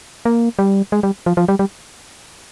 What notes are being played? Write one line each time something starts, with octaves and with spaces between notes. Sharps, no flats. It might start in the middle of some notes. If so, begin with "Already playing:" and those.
A#3
G3
G#3
G3
F3
F3
G3
G3